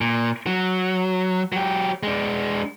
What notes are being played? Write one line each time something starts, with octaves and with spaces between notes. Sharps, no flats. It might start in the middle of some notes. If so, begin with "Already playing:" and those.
A#2
F#3
F#3 G4
G#3 D4